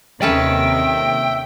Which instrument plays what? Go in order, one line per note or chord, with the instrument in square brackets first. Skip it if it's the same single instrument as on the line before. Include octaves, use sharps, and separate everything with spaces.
[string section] D#2 C3 D#3 [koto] C#4 A4 B4 [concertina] E5 [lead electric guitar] G5